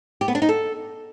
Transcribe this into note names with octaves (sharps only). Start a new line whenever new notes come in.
G4
B3
D4
D#4
A4